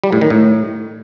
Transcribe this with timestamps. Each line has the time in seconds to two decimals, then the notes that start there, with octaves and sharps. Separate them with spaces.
0.04 G3
0.12 A2
0.21 D#3
0.30 A2